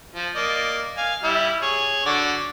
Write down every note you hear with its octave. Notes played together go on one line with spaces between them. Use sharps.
F3
A#3 D5 D#5
F5 G#5
G3 E4
G#4 C#5
D3 F#4 D5